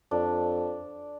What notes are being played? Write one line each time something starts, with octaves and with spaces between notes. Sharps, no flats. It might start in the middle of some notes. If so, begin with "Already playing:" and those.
F2 D4